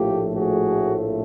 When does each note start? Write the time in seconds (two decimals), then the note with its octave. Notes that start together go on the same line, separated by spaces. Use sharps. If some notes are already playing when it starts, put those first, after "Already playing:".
Already playing: A#1 A2 F3 A3 F4 G4
0.34 F#4 G#4